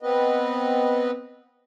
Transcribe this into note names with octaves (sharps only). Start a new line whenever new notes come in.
B3 C4 B4 D#5